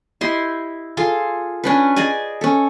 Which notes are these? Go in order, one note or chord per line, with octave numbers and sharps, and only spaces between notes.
E4 G4 D#5 C6
F4 G#4 A4 C6
C#4 D4 B4
G#4 D5 D#5 G#5
C#4 A4